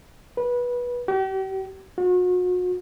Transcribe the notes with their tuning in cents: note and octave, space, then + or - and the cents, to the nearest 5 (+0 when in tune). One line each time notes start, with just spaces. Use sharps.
B4 -20
G4 -40
F#4 -40